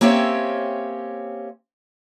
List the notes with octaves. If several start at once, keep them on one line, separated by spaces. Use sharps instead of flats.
A#3 C4 C#4 G4 C#5 E5